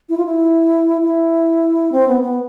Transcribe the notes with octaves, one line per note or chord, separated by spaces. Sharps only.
E4
F4
E4
E4
C4
B3
B3